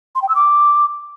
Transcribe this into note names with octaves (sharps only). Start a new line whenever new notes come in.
C6
G5
E6
D6